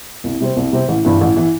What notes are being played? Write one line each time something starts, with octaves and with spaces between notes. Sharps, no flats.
C2
C3 G3 C4
C2
C3 G3 C4
A1
G2 E3
A1
E3